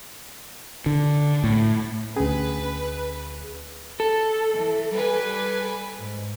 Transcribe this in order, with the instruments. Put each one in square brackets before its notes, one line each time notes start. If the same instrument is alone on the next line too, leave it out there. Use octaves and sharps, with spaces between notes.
[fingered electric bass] D3
A2
[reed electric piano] D2 G#4 [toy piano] C#4 [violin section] B4
[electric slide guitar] A4
[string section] E3
G3 B4 G#5
G#2